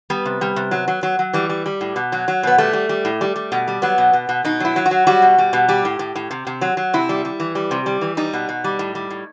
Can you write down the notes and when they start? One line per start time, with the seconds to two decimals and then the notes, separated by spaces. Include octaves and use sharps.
0.10 G3 B3
0.25 C3
0.41 G3
0.56 C3
0.71 F#3
0.88 F#3
1.03 F#3
1.19 F#3
1.33 E3 G3
1.49 G3
1.66 G3
1.81 A2
1.96 B2
2.12 F#3
2.28 F#3
2.43 B2 B3
2.58 G3 A3
2.73 G3
2.89 G3
3.05 A2
3.21 G3
3.36 G3
3.52 B2
3.68 G3
3.82 F#3 B3
3.98 B2
4.13 B2
4.29 B2
4.45 B2 D#4
4.60 F#3 E4
4.76 F#3
4.86 F#4
4.91 F#3
5.07 G3 F#4
5.22 B2
5.38 G3
5.53 B2
5.68 G3 G4
5.85 A2
5.99 A2
6.16 A2
6.31 C3
6.47 C3
6.61 F#3
6.77 F#3
6.94 C3 E4
7.09 G3
7.25 G3
7.40 E3
7.55 G3
7.71 C3
7.86 G3
8.01 E3
8.17 G3 D#4
8.33 B2
8.49 B2
8.64 G3
8.79 A2
8.95 G3
9.10 A2